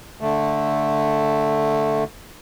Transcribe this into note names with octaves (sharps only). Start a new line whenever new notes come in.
D3 A3